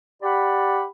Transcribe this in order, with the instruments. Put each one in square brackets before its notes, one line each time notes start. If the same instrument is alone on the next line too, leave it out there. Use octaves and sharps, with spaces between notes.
[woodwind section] G4 D5 F#5 B5